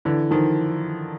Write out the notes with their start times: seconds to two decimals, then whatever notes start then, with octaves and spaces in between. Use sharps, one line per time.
0.05 D3 E3
0.31 D#3 F3